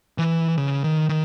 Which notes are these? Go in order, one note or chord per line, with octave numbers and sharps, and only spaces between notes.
E3
C#3
D#3
D#3